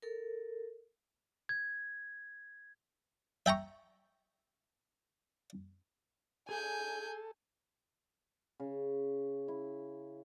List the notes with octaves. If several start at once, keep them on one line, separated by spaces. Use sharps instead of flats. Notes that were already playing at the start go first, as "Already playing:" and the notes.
A4 A#4
G#6
E5 G5 A#5 C#6
G#4 A4 G#5 G6
C#3
E4